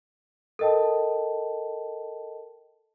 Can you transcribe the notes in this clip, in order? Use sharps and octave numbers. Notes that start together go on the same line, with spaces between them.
A4 A#4 D#5 G5 A5